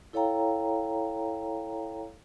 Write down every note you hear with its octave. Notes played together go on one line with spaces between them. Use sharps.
E4 A4 C#5 F5 G5 A#5